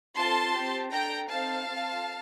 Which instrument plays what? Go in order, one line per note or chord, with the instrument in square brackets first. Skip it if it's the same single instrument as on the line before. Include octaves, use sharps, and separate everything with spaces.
[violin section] C4 F4 A4 A5 C6
C4 G4
D4 A4 G5 A#5
C4 D#4 A4 F5 A5
C4 F4 A4